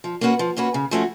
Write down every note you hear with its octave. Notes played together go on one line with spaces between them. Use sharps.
F3
A#3 C#4 F#4 B4
F3
A#3 C#4 F#4 B4
C#3
F3 A3 C#4 F#4